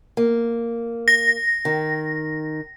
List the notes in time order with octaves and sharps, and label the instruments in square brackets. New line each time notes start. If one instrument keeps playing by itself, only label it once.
[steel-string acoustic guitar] A#3
[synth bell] A#6
[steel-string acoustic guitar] D#3